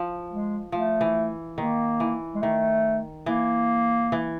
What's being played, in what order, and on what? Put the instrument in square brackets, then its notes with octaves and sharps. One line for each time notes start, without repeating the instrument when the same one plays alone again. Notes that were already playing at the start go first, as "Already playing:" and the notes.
Already playing: [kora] F3
[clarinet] G#3
[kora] F3 [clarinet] A3
[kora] E3
[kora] D#3 [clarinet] A#3
[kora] E3
[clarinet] G#3
[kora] D#3 [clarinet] A3
[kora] E3 [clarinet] A#3
[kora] E3